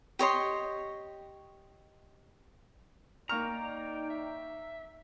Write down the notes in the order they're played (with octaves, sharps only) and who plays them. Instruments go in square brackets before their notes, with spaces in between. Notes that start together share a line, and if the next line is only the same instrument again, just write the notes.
[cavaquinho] G4 C#5 D#5 C6
[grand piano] A#3 C#6 F6 [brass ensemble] D#4 D5 [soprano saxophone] G5 [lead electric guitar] A#5
[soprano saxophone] E5